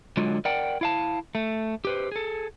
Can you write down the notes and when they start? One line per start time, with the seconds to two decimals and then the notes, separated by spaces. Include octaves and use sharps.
0.17 D3 F#3 G#3 F4
0.45 A#4 D5 F#5 G5
0.81 E4 F5 A5
1.35 A3
1.85 G4 B4 C5
2.12 G#4 A4